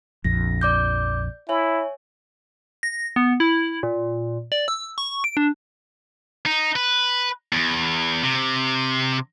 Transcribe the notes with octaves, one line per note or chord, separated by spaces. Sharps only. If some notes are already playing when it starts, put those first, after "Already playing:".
A#1 F2 A#6
D5 D6 G6
E4 C#5 E5 G#5
A#6
B3
E4
A#2
D5
E6
C#6
D7
D4
D#4
B4
E2
C3